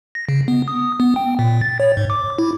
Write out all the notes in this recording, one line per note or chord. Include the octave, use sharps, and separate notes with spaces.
A#6
C#3
B3
D#6
B3
G5
A#2
A6
C#5
G#2
D6
E4